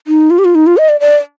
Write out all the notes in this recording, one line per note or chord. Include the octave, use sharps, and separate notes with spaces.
D#4
F4
G4
F4
D#4
F4
D#5
D5
D5